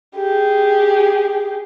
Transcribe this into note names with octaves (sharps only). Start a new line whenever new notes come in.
G4 G#4